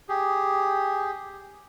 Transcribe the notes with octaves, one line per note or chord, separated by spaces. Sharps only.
G4 G#4